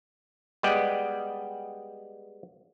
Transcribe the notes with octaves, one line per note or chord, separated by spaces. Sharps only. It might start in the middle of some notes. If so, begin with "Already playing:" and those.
G3 G#3 B3 D5 D#5 G5